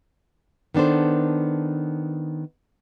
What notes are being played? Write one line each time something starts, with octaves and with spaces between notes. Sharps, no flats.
D#3 B3 D4 A4 C5